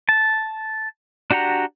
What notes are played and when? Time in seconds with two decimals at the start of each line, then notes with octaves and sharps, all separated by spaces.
0.09 A5
1.31 D4 F#4 G4 F#5 A#5